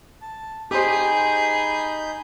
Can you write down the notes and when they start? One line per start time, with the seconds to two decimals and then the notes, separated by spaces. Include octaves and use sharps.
0.21 A5
0.71 D#4 G4 G#4 C5 B5 G6